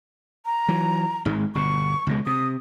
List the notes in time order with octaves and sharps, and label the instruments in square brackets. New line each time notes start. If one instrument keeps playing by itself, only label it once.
[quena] A#5
[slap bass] E3 F#3
G#1 G#2 G#3
[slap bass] G1 B2 [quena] C#6
[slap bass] C#2 B2 G#3
[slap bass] C3 [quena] D#6